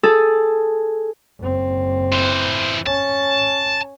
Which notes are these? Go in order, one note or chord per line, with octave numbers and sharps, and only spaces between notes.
G#4 A4 A5
F#1 C4
E3 C5
C#4 A5